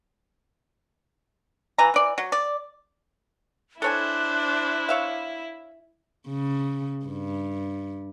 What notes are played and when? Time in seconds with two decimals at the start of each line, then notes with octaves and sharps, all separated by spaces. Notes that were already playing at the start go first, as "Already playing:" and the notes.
1.78 E3 A#5
1.94 E3 D5
2.18 F#3
2.32 D5
3.82 D4 E4 A4 C5 C#5 G#5 F#6
4.89 C#5 E5 F5
6.28 C#3
7.05 G2